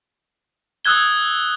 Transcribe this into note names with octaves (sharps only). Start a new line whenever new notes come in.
D#6 E6 F#6 G#6 G7